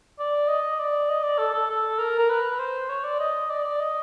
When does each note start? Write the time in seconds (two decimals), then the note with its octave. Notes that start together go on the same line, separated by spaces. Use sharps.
0.19 D5
0.48 D#5
0.79 D5
1.09 D#5
1.23 D5
1.38 A4
1.54 A4
1.69 A4
1.98 A#4
2.19 A#4
2.29 B4
2.59 C5
2.89 C#5
3.04 D5
3.20 D#5
3.50 D5
3.65 D5
3.80 D#5